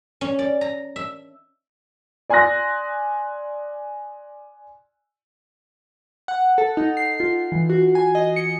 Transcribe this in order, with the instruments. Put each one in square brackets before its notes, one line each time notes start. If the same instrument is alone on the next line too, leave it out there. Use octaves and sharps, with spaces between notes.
[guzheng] C#4
D5
A#5
E5
[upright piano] D5 G#5 C6 D#6 F#6 A#6
[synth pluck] F#5
A4
D#4
C7
F4
E3
F#4
G#5
D#5
C#7